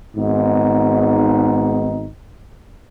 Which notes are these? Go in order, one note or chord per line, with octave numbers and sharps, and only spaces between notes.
G#1 G#2 B3 D#4